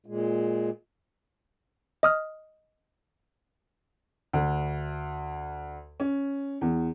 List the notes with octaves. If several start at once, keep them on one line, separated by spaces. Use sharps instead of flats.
A#2 G#3
D#5 D#6 F6
D2
C#4
E2